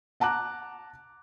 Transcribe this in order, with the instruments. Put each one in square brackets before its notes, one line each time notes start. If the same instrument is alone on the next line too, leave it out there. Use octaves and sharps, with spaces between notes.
[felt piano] F#5 A5 A#5 D6 F#6